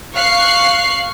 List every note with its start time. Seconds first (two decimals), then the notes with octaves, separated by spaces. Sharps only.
0.13 F5 C#6 F#6 C7